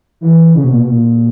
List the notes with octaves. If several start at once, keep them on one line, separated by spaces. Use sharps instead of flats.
E3
C#3
B2
A#2
B2
A#2